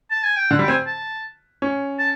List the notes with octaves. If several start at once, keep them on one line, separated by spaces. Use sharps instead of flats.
A5
G#5
G5
D3 F#5
G3
G5
C4 G#5
A5
C#4
A5